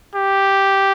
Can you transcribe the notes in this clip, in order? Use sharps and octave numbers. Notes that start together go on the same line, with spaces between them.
G4